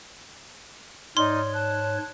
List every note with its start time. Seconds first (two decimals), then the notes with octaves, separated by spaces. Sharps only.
1.17 G#2 D#4 C#5 D5 C6 F6
1.53 A5 F#6